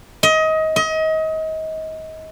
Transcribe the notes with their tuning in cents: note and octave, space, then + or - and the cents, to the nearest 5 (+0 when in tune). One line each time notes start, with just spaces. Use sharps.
D#5 +25
D#5 +30